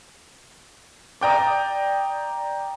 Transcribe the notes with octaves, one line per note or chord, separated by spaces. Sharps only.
D5 G5 A#5 D#6